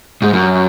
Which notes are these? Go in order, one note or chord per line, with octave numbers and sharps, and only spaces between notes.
G#2
F#2